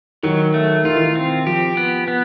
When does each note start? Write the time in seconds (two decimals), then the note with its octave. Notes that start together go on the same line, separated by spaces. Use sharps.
0.23 D#3 F#3
0.54 A3
0.85 D#3 F4
0.94 E3
1.04 D#3
1.15 C4
1.46 F3 G4
1.77 B3
2.08 B3